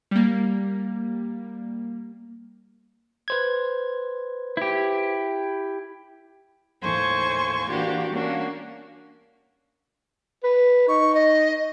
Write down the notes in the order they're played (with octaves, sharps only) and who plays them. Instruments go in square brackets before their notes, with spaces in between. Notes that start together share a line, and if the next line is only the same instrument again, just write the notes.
[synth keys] G3 A#3
[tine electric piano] B4 C5 G#6
[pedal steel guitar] E4 G4
[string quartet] D#2 A2 C5 G#5 C#6 G#6
E3 A#3 D4 F#4 G4
A#3 C#4 D4 F#4
[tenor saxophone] B4
[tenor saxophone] D#4 [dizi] C#6
[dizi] D#5